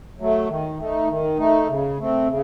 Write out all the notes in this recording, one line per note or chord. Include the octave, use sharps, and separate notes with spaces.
F#3 A3
D#3
A3 D#4
D#3
A3 D#4
C#3
A3 C4
C#3